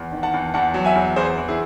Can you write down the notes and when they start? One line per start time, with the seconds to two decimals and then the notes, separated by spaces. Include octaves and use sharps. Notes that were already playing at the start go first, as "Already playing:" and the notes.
Already playing: E2
0.12 D#3
0.23 F#5 A5
0.33 E2
0.54 E2 F#5 A5
0.74 F#3
0.85 E5 G#5
0.95 E2
1.16 E2 G#4 C5
1.38 E2
1.48 E4 G#4